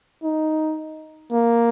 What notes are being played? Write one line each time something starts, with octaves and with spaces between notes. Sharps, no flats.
D#4
A#3